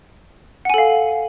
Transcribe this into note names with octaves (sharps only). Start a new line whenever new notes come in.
A4 F5 F#5 G#5